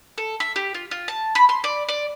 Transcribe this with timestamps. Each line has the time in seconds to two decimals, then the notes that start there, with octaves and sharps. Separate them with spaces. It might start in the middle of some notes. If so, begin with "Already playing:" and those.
0.18 A4
0.40 E5
0.56 G4
0.74 F4
0.91 F4
1.08 A5
1.35 B5
1.49 C6
1.64 D5
1.89 D5